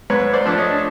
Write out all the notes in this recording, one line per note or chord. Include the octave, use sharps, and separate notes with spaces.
G#2 B4 C#5
C5 D5
F3 A3 D4
C#5 D#5